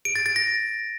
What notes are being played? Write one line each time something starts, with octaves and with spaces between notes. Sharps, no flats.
D7
A6
A6
A#6